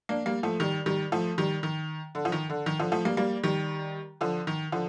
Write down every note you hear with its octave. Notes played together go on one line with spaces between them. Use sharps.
A#3 D4
G3 A#3
F3 A3
D#3 G3
D#3 G3
F3 A3
D#3 G3
D#3
D3
F3
D#3
D3
D#3
D3 F3
F3 A3
G3 A#3
G3 A#3
D#3 G3
D3 F3
D#3
D3 F3